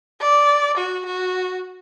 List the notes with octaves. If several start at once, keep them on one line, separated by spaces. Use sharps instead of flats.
D5
F#4
F#4